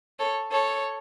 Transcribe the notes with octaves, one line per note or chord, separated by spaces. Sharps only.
A4 C#5
A4 C#5